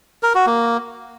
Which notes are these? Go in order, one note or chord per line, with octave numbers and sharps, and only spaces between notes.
A#4
F#4
A#3